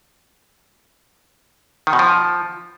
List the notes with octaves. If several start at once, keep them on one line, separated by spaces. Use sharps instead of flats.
D#3
B2
F3